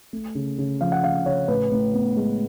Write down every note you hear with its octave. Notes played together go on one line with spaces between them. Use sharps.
A3
C#3
C#3
F3 F5
F#5
C#3 F5
C#3 C#5
A2 B4
A2
B3
G#3